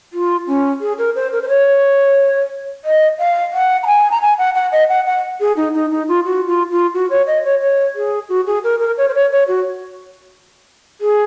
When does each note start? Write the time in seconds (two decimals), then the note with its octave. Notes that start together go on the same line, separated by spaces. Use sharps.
0.13 F4
0.46 C#4
0.81 G#4
0.98 A#4
1.15 C5
1.32 A#4
1.41 C5
1.48 C#5
2.84 D#5
3.18 F5
3.53 F#5
3.83 A#5
3.87 G#5
4.11 A#5
4.21 G#5
4.38 F#5
4.54 F#5
4.72 D#5
4.89 F#5
5.06 F#5
5.40 G#4
5.56 D#4
5.74 D#4
5.91 D#4
6.08 F4
6.25 F#4
6.47 F4
6.71 F4
6.93 F#4
7.10 C#5
7.26 D#5
7.43 C#5
7.61 C#5
7.95 G#4
8.29 F#4
8.46 G#4
8.63 A#4
8.79 A#4
8.97 C#5
9.08 C5
9.14 C#5
9.32 C#5
9.47 F#4
11.01 G#4